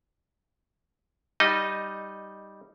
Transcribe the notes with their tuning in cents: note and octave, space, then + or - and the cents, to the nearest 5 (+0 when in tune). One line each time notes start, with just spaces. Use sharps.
G3 +0 D#4 +0 D#5 -15